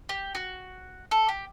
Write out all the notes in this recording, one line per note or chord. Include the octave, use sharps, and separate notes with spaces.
G4
F#4
A4
G4